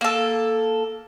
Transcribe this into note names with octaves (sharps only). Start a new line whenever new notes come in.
A#3 A4